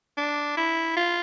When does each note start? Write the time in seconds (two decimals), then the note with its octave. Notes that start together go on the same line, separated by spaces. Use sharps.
0.17 D4
0.57 E4
0.97 F4